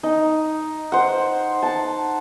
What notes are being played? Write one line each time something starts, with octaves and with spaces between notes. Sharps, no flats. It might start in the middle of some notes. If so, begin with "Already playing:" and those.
D#4
C5 F#5
A5